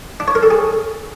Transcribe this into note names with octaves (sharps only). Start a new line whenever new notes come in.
D4
C#5
A#4
A4
G#4